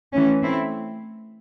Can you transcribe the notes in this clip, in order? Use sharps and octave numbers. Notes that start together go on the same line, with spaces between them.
E3 A3 C#4
A3 C4 E4